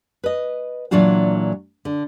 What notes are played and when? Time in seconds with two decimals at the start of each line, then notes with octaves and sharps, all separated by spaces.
0.24 B4 D#5
0.91 A#2 E3 F#3 D4 F4 F#4
1.85 D3